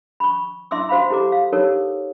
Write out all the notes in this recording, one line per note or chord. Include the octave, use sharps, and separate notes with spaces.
B5 C#6
E4 E5 C6 D6 E6
F#4 C5 F5 B5
E4 G4 A4 A#5 D6
F5
D#4 G4 A4 A#4 C#5